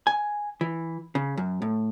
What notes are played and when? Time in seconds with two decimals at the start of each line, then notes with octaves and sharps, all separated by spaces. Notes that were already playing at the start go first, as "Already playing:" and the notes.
0.07 G#5
0.61 E3
1.15 C#3
1.37 F#2
1.62 A2